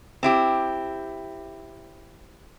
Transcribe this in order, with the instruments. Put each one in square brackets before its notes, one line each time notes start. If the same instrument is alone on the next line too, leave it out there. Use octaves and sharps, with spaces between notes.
[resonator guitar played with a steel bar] C4 E4 G4